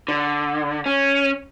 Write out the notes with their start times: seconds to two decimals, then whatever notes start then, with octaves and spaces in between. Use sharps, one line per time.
0.08 D3
0.86 C#4